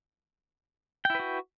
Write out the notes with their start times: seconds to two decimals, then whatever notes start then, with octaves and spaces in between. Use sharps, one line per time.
1.05 G5
1.10 E4
1.15 B4
1.20 F#4